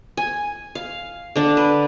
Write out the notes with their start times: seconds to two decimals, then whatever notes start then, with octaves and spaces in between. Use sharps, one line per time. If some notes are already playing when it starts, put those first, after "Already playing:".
0.17 G#5
0.75 F5
1.36 D3 D4
1.57 B4